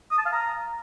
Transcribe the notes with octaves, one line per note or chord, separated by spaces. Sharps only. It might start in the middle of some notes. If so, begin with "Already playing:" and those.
D#6
A5
F5
A#5